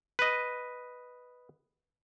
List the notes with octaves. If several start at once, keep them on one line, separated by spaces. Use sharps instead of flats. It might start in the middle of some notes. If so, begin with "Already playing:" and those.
B4 D#5